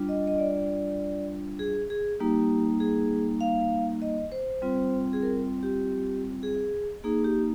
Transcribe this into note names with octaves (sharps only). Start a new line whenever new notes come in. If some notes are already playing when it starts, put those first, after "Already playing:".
Already playing: G3 D4 F4
D#5
D#5
D5
G#4
G#4
G3 A#3 D#4 G4
G#4
F5
D#5
C5
G3 C4 F4
G#4
A#4
G4
G#4
A#3 D#4 G#4
G4